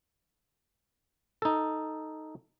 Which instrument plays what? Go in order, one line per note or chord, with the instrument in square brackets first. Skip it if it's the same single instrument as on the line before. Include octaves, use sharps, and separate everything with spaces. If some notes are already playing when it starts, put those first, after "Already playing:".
[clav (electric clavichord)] D#4 A4